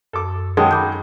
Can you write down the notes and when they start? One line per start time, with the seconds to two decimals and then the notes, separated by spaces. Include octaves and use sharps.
0.13 F#2 A4 D6
0.57 F#2 D#3 G#3 G5 A5 D#6
0.71 B5 D6 G6